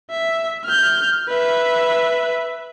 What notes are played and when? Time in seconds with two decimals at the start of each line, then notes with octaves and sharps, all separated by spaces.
0.11 E5
0.65 F6 G6
1.29 B4 E5